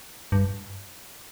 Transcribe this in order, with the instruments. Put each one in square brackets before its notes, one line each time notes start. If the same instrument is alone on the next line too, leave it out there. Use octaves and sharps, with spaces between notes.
[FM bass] G2